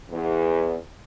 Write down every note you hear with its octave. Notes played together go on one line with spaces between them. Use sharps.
E2